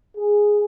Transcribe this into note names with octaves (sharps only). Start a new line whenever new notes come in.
G#4